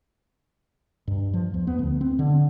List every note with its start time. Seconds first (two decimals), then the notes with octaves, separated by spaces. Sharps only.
1.08 G2
1.34 F3
1.54 E2
1.67 B3
1.79 D2
2.01 C4
2.19 D3